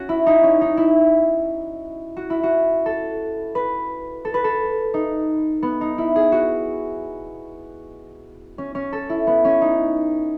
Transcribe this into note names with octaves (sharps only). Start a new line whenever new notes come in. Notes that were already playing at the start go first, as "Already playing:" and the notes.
Already playing: C#4 F#4
E4
D#4
C#4
D#4
E4
F#4
E4
F#4
A4
B4
A4
B4
A4
D#4
B3
D#4
E4
G#4
F#4
C#4
C#4
A4
E4
B3
C#4
D#4